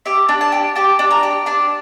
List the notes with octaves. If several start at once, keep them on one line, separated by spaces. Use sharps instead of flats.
G4 E5
D4
A5
G4
G4 A5
D4
A#5
G4
D4 A5